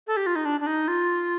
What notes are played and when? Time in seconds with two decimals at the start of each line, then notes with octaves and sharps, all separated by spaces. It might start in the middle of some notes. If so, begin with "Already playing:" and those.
0.07 A4
0.17 G4
0.27 F4
0.36 D#4
0.45 D4
0.60 D4
0.67 D#4
0.88 F4